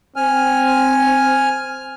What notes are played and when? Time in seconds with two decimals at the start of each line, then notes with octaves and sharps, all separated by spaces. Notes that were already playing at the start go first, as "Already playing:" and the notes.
0.16 C4 G#5 F6